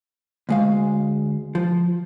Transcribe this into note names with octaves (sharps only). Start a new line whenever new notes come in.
D2 G#3 F5
F3